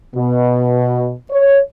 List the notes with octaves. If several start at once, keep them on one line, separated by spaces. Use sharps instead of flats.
B2
C#5